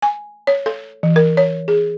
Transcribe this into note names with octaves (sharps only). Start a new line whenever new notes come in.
G#5
C#5
A4
E3
A#4
C#5
G#4